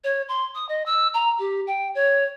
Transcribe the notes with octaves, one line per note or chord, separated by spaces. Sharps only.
C#5
C6
D#6
D#5
E6
A#5
G4
G5
C#5